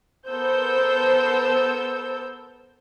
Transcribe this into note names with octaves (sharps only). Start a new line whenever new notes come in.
B3 A4 A#4 C5 E6 G6